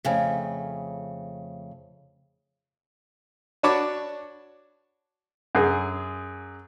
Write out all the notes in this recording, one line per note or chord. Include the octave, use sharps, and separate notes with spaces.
F2 C#3 A3
D4 F#4 C#5 A5 B5 D6
F#2 G#4